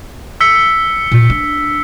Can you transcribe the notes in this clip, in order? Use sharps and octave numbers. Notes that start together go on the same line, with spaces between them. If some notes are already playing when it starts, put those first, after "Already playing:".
E6 B6 C#7
A#2
D4